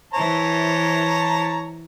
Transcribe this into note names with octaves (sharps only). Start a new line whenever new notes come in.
E3 C5 C#5 A5 A#5